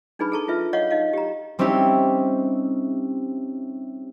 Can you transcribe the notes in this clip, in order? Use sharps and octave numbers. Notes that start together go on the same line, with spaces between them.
D4 D#4 G#4 B4 B5
G#4 A4 A5 A#5 C#6
F4 B4 E5
C#5 D#5 F5 F#5 C#6
D#4 D#5 F5
G4 A#5
G3 C4 C#4 D#4 E4 G4